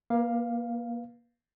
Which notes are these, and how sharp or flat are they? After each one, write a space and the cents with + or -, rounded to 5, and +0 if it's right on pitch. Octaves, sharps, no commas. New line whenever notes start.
A#3 +25 B4 -10 F5 +0